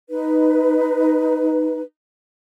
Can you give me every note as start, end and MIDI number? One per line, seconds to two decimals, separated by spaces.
0.10 1.81 63
0.10 1.81 71